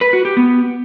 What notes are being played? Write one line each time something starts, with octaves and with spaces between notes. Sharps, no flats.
B4
F#4
G4
B3